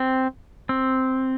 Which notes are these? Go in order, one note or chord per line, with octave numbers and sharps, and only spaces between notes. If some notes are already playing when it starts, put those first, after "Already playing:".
Already playing: C4
C4